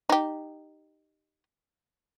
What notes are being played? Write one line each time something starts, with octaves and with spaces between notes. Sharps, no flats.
D#4 G4